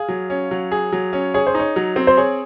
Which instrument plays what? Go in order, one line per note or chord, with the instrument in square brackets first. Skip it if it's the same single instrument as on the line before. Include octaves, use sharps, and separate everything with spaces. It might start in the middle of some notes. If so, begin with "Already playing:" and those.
Already playing: [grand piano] G#4 [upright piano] F5
[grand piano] F#3
C#4
F#3
G#4
F#3
C#4
[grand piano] G#4 [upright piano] C#5
[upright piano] C5
[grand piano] D#4 [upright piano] C#5
[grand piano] F#3
C4
[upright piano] C5
[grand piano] G#4 [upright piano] C#5